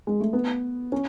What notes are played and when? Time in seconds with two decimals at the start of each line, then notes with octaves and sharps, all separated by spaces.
0.07 G#3
0.20 A3
0.33 B3
0.92 C#4